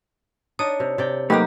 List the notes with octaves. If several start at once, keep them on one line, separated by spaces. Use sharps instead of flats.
D4 D#4 C#5 D#6
C3
C3 D5 G5
F#3 A3 A#3 D#4 G4 B4 A#5